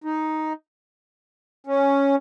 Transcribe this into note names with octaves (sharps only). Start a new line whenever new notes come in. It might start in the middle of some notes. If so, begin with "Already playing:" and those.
D#4
C#4